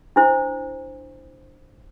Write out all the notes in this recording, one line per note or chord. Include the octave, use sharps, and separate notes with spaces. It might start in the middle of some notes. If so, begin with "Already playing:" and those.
D4 E4 C5